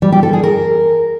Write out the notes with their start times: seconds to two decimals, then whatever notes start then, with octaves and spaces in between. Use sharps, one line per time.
0.02 G3
0.12 G4
0.23 A4
0.33 G#4
0.43 A#4